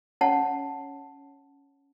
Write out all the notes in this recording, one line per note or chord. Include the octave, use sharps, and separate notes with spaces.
C#4 C#5 F#5 A5